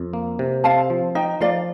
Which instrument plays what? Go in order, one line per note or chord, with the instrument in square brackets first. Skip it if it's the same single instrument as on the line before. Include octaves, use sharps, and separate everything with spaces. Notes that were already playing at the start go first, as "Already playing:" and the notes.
Already playing: [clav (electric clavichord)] F2
A#3
C3
[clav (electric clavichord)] C4 [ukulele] F5 A5
[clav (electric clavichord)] F3
[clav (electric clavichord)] D#4 [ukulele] D#5 G5
[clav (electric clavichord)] F3 [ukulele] D5 F5